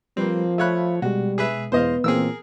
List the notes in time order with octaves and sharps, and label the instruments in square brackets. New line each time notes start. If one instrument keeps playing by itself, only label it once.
[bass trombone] F3 [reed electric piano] G3 B4 [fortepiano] A#3 C4
[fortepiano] A3 C#5 F#6 [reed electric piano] E5 F5 B5
[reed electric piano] B2 G#3 [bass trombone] G3 [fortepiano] F#4
[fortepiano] G#4 B4 E5
[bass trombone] E2 [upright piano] B3 [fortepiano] C5 D#5 F5
[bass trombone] A#2 [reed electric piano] E3 A#3 C4 [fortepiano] G#4 A#4 E6